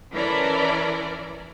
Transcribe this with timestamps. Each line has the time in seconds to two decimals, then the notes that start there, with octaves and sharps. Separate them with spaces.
0.14 E3 C#4 A4 A#4 D5